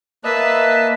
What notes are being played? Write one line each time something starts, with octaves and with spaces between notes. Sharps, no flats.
A#3 B4 D#5 E5 A5